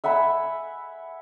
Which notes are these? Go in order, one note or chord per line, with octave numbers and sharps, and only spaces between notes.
E5 F#5 G#5 B5